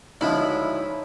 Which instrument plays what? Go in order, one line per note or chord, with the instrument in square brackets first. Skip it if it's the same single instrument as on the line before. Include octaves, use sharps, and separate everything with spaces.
[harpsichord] D2 F3 G#3 [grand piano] C#4 D#4 [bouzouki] E4